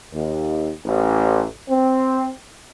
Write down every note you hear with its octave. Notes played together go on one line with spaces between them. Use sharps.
D#2
A1
C4